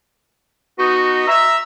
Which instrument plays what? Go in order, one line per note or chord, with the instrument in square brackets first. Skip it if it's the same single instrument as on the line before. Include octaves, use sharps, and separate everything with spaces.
[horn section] B3 D#4 [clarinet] F#4
[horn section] E5 [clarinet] A#5